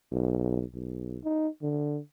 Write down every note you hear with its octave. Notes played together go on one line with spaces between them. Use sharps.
B1
B1
D#4
D3